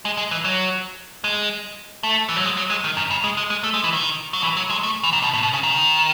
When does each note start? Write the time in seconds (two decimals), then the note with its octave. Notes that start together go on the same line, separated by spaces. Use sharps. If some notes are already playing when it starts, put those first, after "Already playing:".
0.05 G#3
0.17 G#3
0.31 E3
0.44 F#3
1.24 G#3
2.03 A3
2.29 E3
2.36 F#3
2.44 G#3
2.57 F#3
2.70 G#3
2.84 D#3
2.97 F#2
3.10 C#3
3.24 G#3
3.37 G#3
3.50 G#3
3.63 A3
3.74 G#3
3.84 E3
3.93 D#3
4.33 F#3
4.43 E3
4.57 F#3
4.70 G#3
4.83 A3
5.03 E3
5.13 D#3
5.22 B2
5.33 A2
5.43 B2
5.53 C#3
5.63 D#3